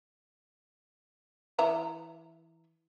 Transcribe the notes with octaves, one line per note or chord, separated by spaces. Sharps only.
E3 E5 A#5